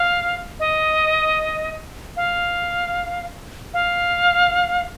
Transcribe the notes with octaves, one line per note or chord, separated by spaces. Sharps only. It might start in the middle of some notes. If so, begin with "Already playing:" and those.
Already playing: F5
D#5
F5
F5